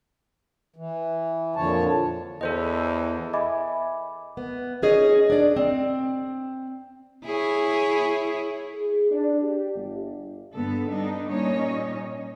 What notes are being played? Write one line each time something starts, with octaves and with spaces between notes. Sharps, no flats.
E3
F2 A#2 D3 F3 C#5 A5
E2 A4 C5 D#5
D#5 E5 G#5 B5 D6
B3
C#4 D#4 G#4 C#5 D#5
D4 D5
C4
E4 G#4 C#5
G#4
D4
G4
G1
G2 D3 B3 A4
G3 B3 D4 D#4
A#2 G3 C#4 D#4 C#5 D#5